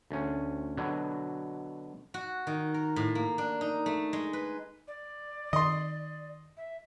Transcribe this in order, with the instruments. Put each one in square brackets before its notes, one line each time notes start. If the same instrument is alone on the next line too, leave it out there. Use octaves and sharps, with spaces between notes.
[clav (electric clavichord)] D2 C#4
B2 D3 F#3
[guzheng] F#4
D#3
A#4
A2
A#3
D4
D#4
A3
G#3
B4
[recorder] D5
[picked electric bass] D#3 [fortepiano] D#5 C6
[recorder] E5